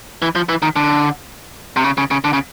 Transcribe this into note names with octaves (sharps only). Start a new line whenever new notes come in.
E3
F3
E3
D#3
D3
C3
C#3
C#3
C#3
D3
C#3